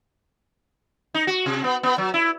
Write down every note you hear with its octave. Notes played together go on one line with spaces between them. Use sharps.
D#4
F#4
C3
B3
B3
F#3
E4